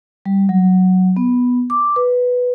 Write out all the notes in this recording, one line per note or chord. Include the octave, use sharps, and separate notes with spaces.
G3
F#3
B3
D6
B4